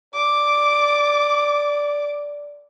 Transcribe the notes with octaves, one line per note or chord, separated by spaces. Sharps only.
D5 D6